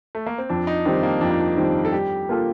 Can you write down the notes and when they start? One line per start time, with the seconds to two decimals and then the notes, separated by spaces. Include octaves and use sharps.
0.15 A3
0.27 A#3
0.38 C4
0.49 F2 D4
0.67 D#4
0.85 D#3 G3 C4 D4
1.03 A#3
1.21 F2 D4
1.31 D#4
1.41 D4
1.57 D#3 G3 C4
1.85 A4
1.92 G3 G4
2.29 A#3 F4 A4